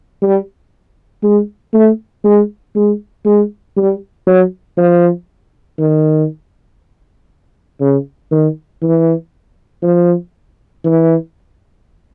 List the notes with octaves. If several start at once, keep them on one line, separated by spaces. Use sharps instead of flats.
G3
G#3
A3
G#3
G#3
G#3
G3
F#3
F3
D#3
C#3
D#3
E3
F3
E3